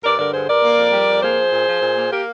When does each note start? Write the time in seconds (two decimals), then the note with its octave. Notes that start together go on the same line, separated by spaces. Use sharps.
0.04 G2 A#4 D5
0.19 D3 A#4 D5
0.33 G2 G#4 C5
0.48 G2 A#4 D5
0.63 A#3
0.78 F2
0.92 G3
1.08 F2
1.22 A#3 G#4 C5
1.37 F3
1.51 A#2
1.67 F3
1.81 A#2
1.97 A#3
2.11 A#3 G4 A#4